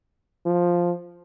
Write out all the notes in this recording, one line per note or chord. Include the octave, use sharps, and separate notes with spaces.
F3